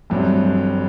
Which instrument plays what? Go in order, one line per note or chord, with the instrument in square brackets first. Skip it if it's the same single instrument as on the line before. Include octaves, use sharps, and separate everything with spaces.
[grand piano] A1 G2 F#3 A3 C4